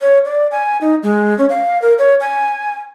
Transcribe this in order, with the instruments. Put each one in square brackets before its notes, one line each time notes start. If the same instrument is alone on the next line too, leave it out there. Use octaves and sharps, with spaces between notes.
[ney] C#5
D5
G#5
D#4
G#3
C#4
F5
A#4
C#5
G#5